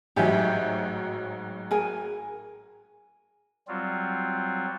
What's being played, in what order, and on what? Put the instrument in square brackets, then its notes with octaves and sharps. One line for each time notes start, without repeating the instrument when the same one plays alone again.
[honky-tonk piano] A1 G#2 F#3 [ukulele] G4 E5 G#5
[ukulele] G#4 A#4 G#5
[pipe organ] F#3 G3 C4 F4